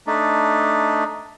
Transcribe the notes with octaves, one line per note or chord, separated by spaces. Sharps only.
A3 D4 D#4